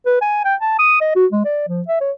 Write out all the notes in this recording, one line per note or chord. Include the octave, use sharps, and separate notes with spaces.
B4
G#5
G5
A5
D#6
D#5
F#4
G#3
D5
F3
E5
C#5